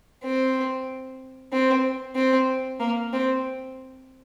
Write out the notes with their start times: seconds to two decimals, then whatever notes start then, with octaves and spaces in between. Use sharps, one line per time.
0.23 C4
1.53 C4
2.16 C4
2.80 A#3
3.13 C4